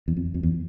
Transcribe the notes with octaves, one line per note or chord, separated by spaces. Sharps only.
E2
F2
F2
E2